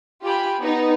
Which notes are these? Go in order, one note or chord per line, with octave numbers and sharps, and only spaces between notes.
F4 G4 G#5 B5
B3 D#4